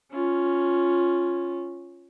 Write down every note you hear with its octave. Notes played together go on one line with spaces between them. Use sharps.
C#4 F4